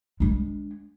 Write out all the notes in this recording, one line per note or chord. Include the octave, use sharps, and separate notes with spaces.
G#3 D4